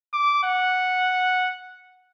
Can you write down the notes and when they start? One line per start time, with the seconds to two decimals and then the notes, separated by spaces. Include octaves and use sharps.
0.13 D6
0.44 F#5